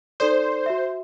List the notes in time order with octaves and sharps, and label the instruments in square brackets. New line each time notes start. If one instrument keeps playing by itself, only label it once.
[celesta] D#4 A4 D5 [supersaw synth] C5
[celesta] F#4 E5